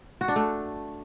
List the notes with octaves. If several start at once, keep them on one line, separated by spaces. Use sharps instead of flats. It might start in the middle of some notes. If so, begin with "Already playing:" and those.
F#4
D4
A3